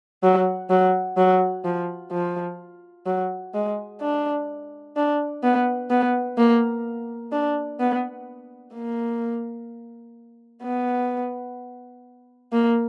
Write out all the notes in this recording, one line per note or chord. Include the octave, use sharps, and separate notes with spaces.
F#3
F#3
F#3
F3
F3
F#3
G#3
D4
D4
B3
B3
A#3
D4
B3
A#3
B3
A#3